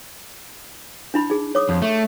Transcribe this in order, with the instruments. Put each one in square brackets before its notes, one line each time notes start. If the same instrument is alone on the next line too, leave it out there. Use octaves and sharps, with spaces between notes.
[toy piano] D4 E4 B5
D#4 G#4
C#5 D6 D#6
[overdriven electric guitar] F2
A3